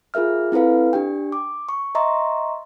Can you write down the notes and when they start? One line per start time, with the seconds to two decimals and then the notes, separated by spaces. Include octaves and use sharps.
0.14 F4 G#4 A#4 E5 F6
0.52 C4 E4 A4 B4 F5
0.93 D4 G4 G5
1.32 D6
1.69 C#6
1.95 D#5 E5 A#5 C6 C#6